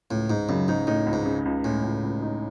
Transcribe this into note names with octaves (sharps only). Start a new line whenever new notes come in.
C#2 A2
G#2 D#4
F#2 C#3
G#2 D#4
A2 D#4
C#2
G#2
C#3
C#2
A2 G#3
C#2
C#2
D#4